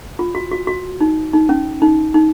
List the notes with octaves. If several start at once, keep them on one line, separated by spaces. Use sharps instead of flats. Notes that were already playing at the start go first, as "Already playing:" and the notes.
F4
F#4
F#4
F#4
D#4
D#4
C#4
D#4
D#4